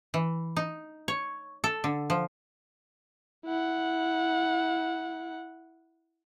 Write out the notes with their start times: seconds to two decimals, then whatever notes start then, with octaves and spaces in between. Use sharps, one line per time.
0.14 E3
0.57 D#4
1.08 C#5
1.64 A4
1.84 D3
2.10 F3
3.45 E4 F#5